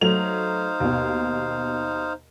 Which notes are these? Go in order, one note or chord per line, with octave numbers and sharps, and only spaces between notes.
F#3 A3 D#4 C5 F5 F7
D#2 B2